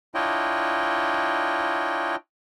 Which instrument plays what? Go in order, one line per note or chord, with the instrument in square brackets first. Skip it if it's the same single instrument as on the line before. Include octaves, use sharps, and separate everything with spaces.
[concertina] D4 E4 F4 C#5 D#5 G5